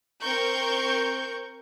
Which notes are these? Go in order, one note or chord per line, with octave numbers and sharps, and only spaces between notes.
C4 A#4 C#6 G6